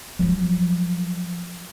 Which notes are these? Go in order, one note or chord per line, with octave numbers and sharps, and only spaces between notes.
F3 F#3